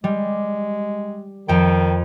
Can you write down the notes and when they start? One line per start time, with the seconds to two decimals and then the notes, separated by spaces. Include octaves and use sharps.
0.04 G3 G#3
1.48 F2 D#3 G5